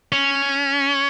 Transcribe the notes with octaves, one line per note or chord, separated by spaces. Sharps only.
C#4